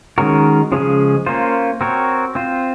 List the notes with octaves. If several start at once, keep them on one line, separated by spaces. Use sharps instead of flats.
D#3 G#3 C#4 F#4 A#4
C#3 F3 G#3 C#4 G#4
A#3 C#4 F4 C5
C4 F#4 A#4 C#5
C4 F4 C5